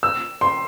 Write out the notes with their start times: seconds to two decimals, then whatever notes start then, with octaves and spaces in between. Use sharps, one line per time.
0.03 E6
0.41 C6